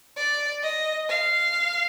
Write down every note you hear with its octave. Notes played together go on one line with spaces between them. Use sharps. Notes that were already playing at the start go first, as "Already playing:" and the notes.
D5
D#5
F5